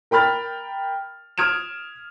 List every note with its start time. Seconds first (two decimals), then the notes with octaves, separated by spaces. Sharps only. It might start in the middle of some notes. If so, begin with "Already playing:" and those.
0.11 A#4 G5 B5 F6 A6
1.38 D#6 F6 G#6 D7 E7